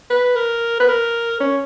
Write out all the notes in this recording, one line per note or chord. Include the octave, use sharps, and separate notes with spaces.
B4
A#4
B4
A#4
C#4